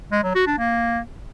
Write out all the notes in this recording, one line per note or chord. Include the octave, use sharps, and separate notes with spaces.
G#3
F#3
F#4
D4
A#3